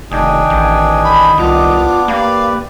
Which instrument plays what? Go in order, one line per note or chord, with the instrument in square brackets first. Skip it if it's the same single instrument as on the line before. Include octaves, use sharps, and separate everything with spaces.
[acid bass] F1 [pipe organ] D#3 D#5 [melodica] D4 G5 G#5
[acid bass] A1
[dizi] B5
[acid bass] C2 [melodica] B3 D4 D6 [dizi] F4
[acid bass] A#3 [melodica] G4 B4 D5 [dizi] F5